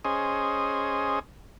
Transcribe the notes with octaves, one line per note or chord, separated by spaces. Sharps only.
C#4 G#4 C5 D#5